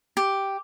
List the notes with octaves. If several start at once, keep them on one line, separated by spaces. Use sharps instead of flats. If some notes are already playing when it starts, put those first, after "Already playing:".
G4